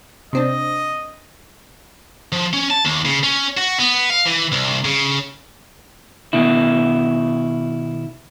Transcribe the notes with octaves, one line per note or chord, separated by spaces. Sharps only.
C3 C4 D4 D#5
F3
C#4
A5
D#2
C#3
C#4
F#4
B3
F5
E3
C2
C#3
B2 D#3 E4